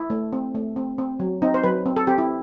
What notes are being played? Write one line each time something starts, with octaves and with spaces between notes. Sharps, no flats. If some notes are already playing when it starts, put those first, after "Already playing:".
Already playing: E4
A3
C4
A3
C4
C4
F#3
C4 D#4
C5
F#3 B4
C4
A4
C4 G4
E4